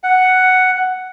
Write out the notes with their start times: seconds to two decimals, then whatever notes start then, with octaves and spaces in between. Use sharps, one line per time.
0.03 F#5